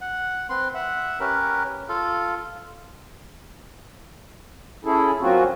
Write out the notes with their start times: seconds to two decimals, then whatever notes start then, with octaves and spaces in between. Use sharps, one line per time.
0.01 F#5
0.50 C4 B4 C6
0.74 E5 F#5
1.20 C#4 G4 A#4 B4
1.89 F4 A4 F5
4.85 C#4 E4 G#4 A4
5.21 F#3 A#3 C4 C#4 F4 F#4